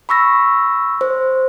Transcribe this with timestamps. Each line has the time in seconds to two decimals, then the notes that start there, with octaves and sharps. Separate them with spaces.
0.09 B5 C#6 E6 A#6
1.01 C5